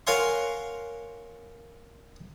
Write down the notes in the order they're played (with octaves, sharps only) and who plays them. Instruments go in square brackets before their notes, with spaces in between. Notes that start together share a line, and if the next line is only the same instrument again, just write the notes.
[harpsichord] A#4 C#5 F5 F#5 G#5 C6